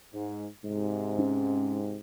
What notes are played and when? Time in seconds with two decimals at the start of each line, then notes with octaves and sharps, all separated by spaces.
0.14 G#2
0.64 G#2 C3
1.18 C#4